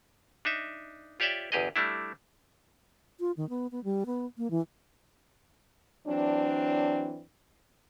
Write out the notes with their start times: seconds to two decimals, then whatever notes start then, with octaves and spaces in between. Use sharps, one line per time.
0.45 D4 D#4 E5
1.20 F4 G4 C#5 D5 E5 G5
1.52 G1 E2 G4 G#4 D#5
1.76 G3 A3 D4 E4
3.20 F4
3.37 D#3
3.49 B3
3.72 B3
3.84 G3
4.06 B3
4.38 A#3
4.51 E3
6.07 E3 F#3 C4 D4